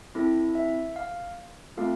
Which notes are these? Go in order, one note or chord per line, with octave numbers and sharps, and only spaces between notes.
C4 E4 A4
E5
F5
A3 C4 F4 A4 F5